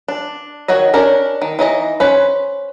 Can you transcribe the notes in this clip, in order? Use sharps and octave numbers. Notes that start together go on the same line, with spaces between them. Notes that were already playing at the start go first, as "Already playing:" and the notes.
D4
D#3 F#4 C#5 D#5
C#4 D4 A#4 C#5
D#3
E3 D#4 D#5 A#5
C#4 B4 C5